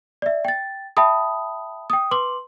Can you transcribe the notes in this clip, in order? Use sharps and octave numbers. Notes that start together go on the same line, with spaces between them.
D5 E5
G5 A6
E5 G5 A5 B5 D#6
G5 D#6
B4 C6 D6 F#7